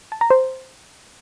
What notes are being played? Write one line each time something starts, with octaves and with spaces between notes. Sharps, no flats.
A5
A#5
C5